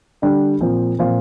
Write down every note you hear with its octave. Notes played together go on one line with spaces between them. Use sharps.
D3 G3 D4
A#2 F3 C4
A#2 F3 C4 F4